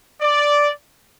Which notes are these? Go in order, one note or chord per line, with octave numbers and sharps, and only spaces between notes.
D5